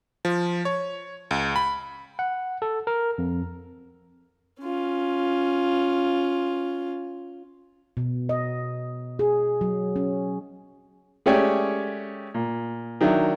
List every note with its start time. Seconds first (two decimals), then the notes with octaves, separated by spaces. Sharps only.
0.25 F3
0.65 C#5
1.31 C#2
1.56 B5
2.19 F#5
2.62 A4
2.87 A#4
3.18 F2
4.61 C#4 F4
7.97 B2
8.29 D#5
9.19 G#4
9.61 F#3
9.96 C#4
11.26 G#3 A3 C#4 G4 C#5 D5
12.34 A#2
13.01 D#3 F#3 D4 E4